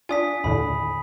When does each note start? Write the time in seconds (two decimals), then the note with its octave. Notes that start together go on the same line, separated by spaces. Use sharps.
0.09 D4 F4 G#5 D#6 B6
0.44 D#2 A2 D3 B5